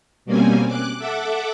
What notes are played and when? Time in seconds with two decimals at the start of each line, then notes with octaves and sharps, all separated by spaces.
0.26 B2 G3 A#3 C4 C#4 G#5
0.67 D6 F#6
0.99 A4 E5 F#5 D6